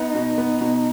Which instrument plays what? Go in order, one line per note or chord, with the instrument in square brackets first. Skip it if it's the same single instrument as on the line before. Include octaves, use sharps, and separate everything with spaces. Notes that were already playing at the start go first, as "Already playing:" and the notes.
Already playing: [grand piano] B3 [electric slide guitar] D#4
[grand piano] B2
B3
B2